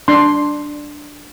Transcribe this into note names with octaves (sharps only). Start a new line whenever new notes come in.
D4 C6